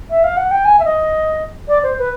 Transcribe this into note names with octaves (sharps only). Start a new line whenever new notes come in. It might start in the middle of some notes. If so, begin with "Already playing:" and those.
E5
F5
F#5
G5
G#5
E5
D#5
D5
C5
B4